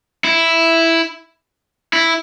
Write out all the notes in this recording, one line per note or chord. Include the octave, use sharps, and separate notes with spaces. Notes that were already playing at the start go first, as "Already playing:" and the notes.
E4
E4